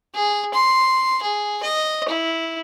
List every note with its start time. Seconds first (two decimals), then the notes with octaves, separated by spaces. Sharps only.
0.14 G#4
0.54 C6
1.22 G#4
1.63 D#5
2.08 E4